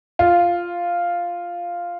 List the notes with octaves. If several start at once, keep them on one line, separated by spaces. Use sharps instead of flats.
F4